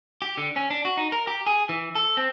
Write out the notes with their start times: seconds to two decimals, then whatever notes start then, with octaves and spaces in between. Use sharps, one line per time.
0.22 G4
0.37 D3
0.56 C#4
0.70 D4
0.85 F#4
0.97 D#4
1.12 A#4
1.27 G4
1.46 G#4
1.69 E3
1.95 A4
2.17 C4